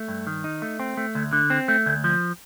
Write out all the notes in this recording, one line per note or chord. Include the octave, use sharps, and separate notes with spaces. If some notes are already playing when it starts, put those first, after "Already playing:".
Already playing: A3
G2
D#3
D#4
A3
C4
A3
D2
D3
C4
A3
D2
F3